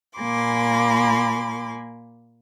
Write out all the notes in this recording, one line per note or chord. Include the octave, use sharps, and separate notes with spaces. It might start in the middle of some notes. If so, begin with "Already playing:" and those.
A#2 A#3 G#5 B5 C6 D6